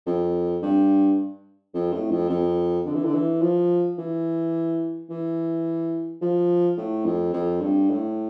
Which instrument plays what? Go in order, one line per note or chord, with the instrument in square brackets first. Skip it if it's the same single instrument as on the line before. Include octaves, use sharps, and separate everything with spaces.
[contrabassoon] F2
G2
F2
A2
F2
F2
D3
E3
D3
E3
F3
E3
E3
F3
A2
F2
F2
G2
A2